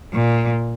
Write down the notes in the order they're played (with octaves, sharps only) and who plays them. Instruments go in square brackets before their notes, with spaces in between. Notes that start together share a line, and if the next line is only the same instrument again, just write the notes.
[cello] A#2